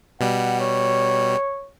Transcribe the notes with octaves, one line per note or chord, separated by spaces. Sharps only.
B2 G3 F#5
C#5